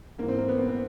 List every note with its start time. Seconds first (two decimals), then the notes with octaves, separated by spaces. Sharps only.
0.18 G#2 E3 A#3
0.28 C4
0.38 A#3
0.48 B3
0.58 C4
0.68 C4